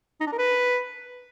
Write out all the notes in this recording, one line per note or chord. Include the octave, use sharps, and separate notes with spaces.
D#4
D4
A#4
B4